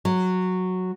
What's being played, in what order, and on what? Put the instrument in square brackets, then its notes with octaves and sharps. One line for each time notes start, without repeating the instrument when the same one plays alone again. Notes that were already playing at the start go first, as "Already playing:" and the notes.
[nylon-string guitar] F#3